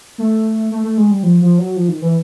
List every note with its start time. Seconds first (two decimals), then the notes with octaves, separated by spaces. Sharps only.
0.18 A3
0.71 A3
0.84 A3
0.98 G#3
1.11 G3
1.23 F3
1.41 F3
1.59 F#3
1.76 F3
1.89 D#3
2.02 E3